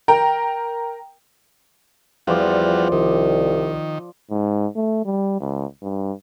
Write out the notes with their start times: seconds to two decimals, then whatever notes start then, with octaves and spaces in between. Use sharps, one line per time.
0.08 A#4 G5 A#5
2.27 E2 F3 G3 F4 F#4 D5
2.92 C2 D#3
4.30 G#2
4.76 A3
5.05 G3
5.40 C#2
5.82 G2